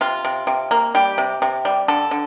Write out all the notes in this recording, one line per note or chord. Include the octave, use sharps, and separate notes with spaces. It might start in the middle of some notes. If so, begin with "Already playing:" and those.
C3 F4
C3
C3
A#3
G3 G4
C3
C3
G3
D3 A4
D3